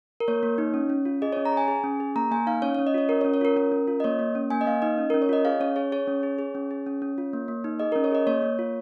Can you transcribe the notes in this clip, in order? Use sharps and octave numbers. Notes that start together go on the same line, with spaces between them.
A#4
A#3 C#5
A#3
D#4
C#4
C#4
F4
G#4 D#5
C#4 C#5
A#5
G#4
G#5
G#4
C#4
G#4
A#3 A#5
A#3 G#5
D#4 F5
C#4 C#5
C#4 C#5
D#5
F4 C#5
C#4 A#4
C#5
C#4
C#5
F4 A#4
C#4 A#4
C#4
F4
D#5
A#3 C#5
A#3
C#4
A#3 G#5
D#5
A#3 F5
D#4 D#5
C#4
C#4 A#4
C#5
F4 D#5
G#4 F5
C#4 C#5
G#4 C#5
G#4 C#5
C#4
G#4
G#4
C#4
G#4
C#4
C#4
F4
A#3
A#3
D#4
G#4 D#5
C#4 A#4
C#5
G#4 D#5
A#3 C#5
A#3
F4